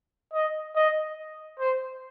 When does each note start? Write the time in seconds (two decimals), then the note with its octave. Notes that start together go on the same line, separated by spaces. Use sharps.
0.33 D#5
0.76 D#5
1.59 C5